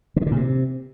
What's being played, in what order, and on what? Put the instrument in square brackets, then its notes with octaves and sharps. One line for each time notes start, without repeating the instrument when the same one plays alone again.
[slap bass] D3
D#3
D3
A#2
C3